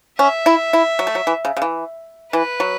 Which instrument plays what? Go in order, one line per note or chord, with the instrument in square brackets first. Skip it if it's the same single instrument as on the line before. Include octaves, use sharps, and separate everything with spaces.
[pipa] C#4 [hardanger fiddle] E5
[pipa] E4
E4
F#3
A3
F#3
E3
C#3
C#3
E3
[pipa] E3 [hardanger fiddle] B4
[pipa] F#3